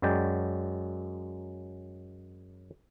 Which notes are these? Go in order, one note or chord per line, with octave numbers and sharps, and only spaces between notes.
F#2 F#3 G#3 D5 G5